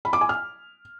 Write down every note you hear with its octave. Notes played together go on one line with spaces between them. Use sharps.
B5
D6
G#5
F6